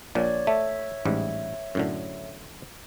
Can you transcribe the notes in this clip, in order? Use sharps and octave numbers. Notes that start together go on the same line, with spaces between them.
A#1 A#2 C#5 D5
A3 C#5 E5
A1 G#2 G3
F#2 A2 D3